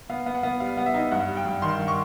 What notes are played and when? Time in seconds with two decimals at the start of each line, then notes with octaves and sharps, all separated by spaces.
0.10 B3 F5
0.26 B3
0.35 F#5
0.43 B3
0.60 G3 F5
0.77 B3
0.86 E5
0.94 D#4
1.11 G2 F#5
1.28 G3
1.37 G5
1.45 G2
1.62 D#3 C6
1.79 G2
1.88 C#6